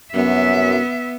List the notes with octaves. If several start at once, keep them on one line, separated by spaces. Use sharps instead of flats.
C2 F#2 B3 E5